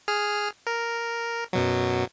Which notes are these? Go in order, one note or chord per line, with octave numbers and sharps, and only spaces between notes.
G#4 F6
A#4
F#2 B2 F#3